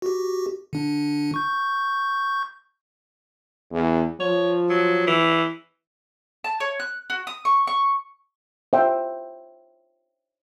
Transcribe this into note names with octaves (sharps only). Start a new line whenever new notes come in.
F#4 G4
D3 D4
C#6 G6
E2
F3 C#5
F#3
E3
A5
C#5
F#6
F#4
D#6
C#6
C#6
C5 E5 G5